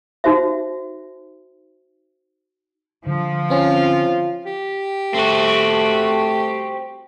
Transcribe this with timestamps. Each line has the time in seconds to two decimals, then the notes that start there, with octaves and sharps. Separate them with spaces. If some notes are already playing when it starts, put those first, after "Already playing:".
0.24 D#4 F#4 C5 E5
3.06 D3 F3
3.50 C4 C#4 F4
4.45 G4
5.15 A3 C4 F#4